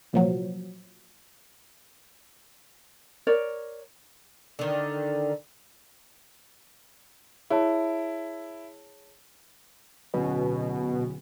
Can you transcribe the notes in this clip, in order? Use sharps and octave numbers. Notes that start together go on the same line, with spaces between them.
C2 A#2 F3 F#3
A#4 C#5 D5
D3 D#3
E4 G#4 C#5 A5
D1 B2 C#4